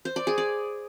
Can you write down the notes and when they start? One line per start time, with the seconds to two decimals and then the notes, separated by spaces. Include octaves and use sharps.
0.05 C5
0.16 D5
0.27 G#4
0.38 D5